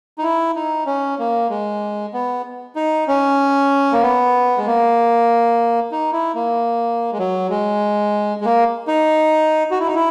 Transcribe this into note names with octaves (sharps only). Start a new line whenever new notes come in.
D#4
E4
D#4
C#4
A#3
G#3
B3
D#4
C#4
A#3
B3
G#3
A#3
D#4
E4
A#3
G#3
F#3
G#3
G#3
A#3
D#4
F#4
E4
D#4
E4